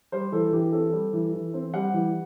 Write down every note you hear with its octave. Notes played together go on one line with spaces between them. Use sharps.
G3 C5
E3 A4
E3 G4
C4 A4
G3
E3
E3
C4
G3 F#5
E3